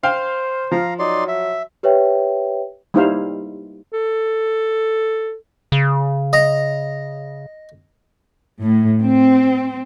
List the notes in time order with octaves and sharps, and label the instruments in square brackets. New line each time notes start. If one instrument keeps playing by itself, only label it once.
[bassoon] C5 [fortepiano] F5 G5
[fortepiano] F3 [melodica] F5 A#5
[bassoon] F#3 [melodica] D#4 D5 C6
[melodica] E5
[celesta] G4 B4 C#5 E5 G5
[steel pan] G3 A#3 D#4 E4 C5 F5
[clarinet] A4
[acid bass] C#3
[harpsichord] D#5 A#5
[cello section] A2
C4